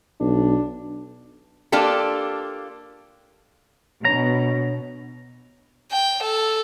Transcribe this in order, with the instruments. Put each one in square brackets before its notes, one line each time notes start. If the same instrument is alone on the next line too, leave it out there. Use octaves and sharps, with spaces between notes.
[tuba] B1 [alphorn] D4
[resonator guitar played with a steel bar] A#3 D4 F4 G4 A4
[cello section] B2 [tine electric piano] D4 C#5 [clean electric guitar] A#5
[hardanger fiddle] G5
A4